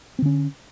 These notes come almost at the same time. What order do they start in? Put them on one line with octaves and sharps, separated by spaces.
C4 D3 C#4